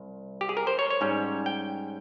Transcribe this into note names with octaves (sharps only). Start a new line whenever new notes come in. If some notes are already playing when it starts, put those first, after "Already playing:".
Already playing: C2
G4
G#4
A#4
C5
C#5
C#5
G#2 G3 C#4
G5